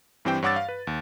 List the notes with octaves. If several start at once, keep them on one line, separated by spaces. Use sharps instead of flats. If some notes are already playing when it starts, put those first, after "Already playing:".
G2 E3 C4 G4 C5 G5
G2 C#5 F#5 D6 E6 A6
F5
B4
D#2